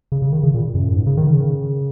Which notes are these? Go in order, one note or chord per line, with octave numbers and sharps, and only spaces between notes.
C#3
C#3
D#3
C#3
A#2
F#2
A#2
G#2
C#3
D#3
C#3